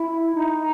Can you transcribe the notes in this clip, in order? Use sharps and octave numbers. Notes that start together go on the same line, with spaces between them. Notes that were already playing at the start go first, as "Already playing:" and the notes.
Already playing: E4
D#4